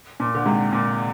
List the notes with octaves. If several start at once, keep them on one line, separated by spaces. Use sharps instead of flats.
A#2
D3
G#2 C3
A#2